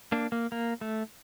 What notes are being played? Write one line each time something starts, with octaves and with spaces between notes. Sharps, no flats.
A#3 D4
A#3
A#3
A3